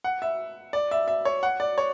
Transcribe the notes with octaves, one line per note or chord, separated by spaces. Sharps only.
F#5
E5
D5
E5
E5
C#5
F#5
D5
C#5